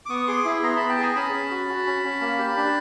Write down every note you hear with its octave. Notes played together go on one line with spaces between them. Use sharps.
D6
B3 C#6 D#6
G#4 C6 D6
E4
B3 A#5 C6
B3 A5 B5
G5 A5
G#4 G#5 A#5
C#4 A5 B5
C#4
F#4
F#4
C#4
C#4
A#3
G4
D4